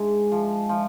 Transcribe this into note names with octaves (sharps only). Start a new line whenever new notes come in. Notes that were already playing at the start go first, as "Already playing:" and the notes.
Already playing: G#2 G#3 D4
F3
F3